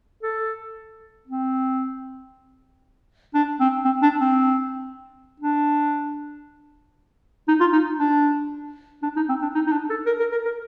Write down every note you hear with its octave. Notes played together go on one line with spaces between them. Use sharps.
A4
C4
D4
C4
C4
D4
C4
D4
D#4
F4
D#4
D4
D4
D#4
C4
D4
D#4
D#4
D4
A4
A#4
A#4
A#4
A#4